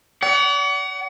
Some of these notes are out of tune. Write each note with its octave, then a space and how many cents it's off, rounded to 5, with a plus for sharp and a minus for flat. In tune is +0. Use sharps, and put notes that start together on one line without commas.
D5 -45 F#5 +25